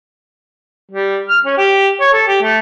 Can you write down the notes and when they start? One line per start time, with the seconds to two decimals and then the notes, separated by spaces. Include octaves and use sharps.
0.92 G3
1.28 F6
1.45 C#4
1.58 G4
2.00 C#5
2.13 A4
2.27 G4
2.42 A3